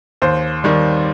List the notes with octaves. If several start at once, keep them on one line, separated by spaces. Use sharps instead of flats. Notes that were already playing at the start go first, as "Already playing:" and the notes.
D#2 C5
D#3 G3